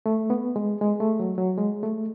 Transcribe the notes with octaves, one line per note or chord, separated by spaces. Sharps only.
A3
B3
G#3
G#3
A3
F#3
F#3
G#3
A3